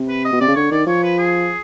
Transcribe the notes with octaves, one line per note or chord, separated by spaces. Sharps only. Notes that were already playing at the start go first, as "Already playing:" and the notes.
Already playing: C3
B4
D#5
B2
C3 D5
C#3
D3 C#5
D#3 D5
F3 C#5
B4
G#4